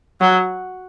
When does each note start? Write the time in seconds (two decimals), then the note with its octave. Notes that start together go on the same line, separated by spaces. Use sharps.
0.21 F#3